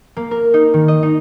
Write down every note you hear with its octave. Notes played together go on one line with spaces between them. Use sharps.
A#3
A#4
D#4
D#3
D#5
D#4